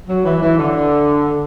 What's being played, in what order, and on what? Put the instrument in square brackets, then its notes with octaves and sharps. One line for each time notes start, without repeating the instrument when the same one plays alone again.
[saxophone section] F#3
E3
E3
D3